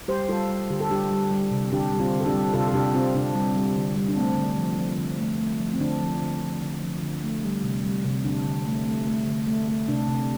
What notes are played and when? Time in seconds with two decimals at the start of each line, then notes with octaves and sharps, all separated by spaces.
0.08 G3 G4 C5
0.29 G3 F4 A4
0.49 G3
0.70 D3 G4
0.80 A4
0.90 G3 D4 G4
1.11 G3
1.31 G3
1.51 C3
1.72 D3 D4 G4
1.92 G3
1.99 C4 F4
2.13 D3
2.20 A4
2.26 D4 G4
2.33 G3
2.54 C3 F4 A4
2.68 A4
2.74 C3 D4 G4
2.94 C3 C4 F4
3.14 C3 D4
3.35 G3
3.56 G3
3.76 D3
3.96 G3
4.09 D4
4.17 A3 C4
4.37 D3
4.58 F3
4.78 F3
4.98 D3
5.19 A3
5.39 A3
5.60 F3
5.73 C4
5.80 D3 D4
6.00 F3
6.21 D3
6.41 F3
6.62 D3
6.82 F3
7.03 D3
7.23 A3
7.44 G3
7.64 C3
7.84 G3
8.04 C3
8.25 D3 D4
8.46 D3
8.66 A3
8.86 A3
9.07 A3
9.27 D3
9.47 A3
9.68 A3
9.88 C3 D4
10.08 C3